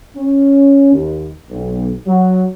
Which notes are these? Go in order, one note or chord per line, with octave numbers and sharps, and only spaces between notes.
C#4
D#2
B1
F#3